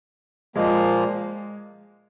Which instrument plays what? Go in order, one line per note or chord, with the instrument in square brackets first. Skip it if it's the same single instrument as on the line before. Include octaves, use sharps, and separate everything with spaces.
[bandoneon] A#2 F3 A#3 [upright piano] G#3